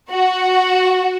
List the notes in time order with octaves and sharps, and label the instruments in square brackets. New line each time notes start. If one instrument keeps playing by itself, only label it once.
[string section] F#4